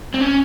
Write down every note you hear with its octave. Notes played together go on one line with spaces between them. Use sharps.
C4
C#4